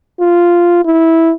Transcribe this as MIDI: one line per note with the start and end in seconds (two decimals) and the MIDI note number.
0.20 0.81 65
0.85 1.32 64